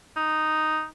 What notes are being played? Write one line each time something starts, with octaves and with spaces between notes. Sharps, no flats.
D#4